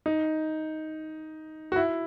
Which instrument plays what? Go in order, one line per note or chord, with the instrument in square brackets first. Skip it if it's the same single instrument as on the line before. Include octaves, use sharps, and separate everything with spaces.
[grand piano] D#4
F#4
E4